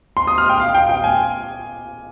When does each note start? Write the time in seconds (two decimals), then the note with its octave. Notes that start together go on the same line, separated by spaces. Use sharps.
0.17 C6
0.27 D#6
0.38 F6
0.49 G5
0.60 F5
0.74 G5
0.89 G5
1.04 G#5